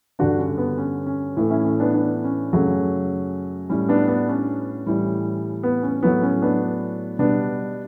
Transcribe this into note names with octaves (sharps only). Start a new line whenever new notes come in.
G2 D3 G3 D4 F#4
C#4
B3
C#4
C#4
A2 E3 A3
C#4 E4
C#4
B3 D4
B3 D4
C#4
F#2 C#3 F#3 A3
A2 G3 C#4
B3 D4
B3 D4
C#4
A2 E3 G3
B3
C#4
A2 F#3 A3 B3
C#4
B3 D4
B2 G3 B3 D4